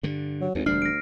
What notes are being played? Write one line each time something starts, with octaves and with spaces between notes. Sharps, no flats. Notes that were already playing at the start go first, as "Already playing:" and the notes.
G2 D3
F#3
G#1 D2
E1 D2 G3 D4 F6 C7
A#6 D7